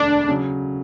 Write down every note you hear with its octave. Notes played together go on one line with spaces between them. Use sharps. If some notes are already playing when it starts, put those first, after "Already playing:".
Already playing: E1 D2 D3 D4
C#3 F#3